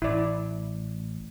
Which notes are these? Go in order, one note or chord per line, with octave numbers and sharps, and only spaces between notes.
A1 E4 D5